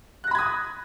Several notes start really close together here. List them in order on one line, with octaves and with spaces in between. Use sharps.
F#6 A#6 B5 G#6 D#6